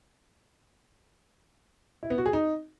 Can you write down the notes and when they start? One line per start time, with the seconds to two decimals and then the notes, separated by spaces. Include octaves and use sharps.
2.03 E4
2.10 B3
2.18 F#4
2.26 G#4
2.33 D#4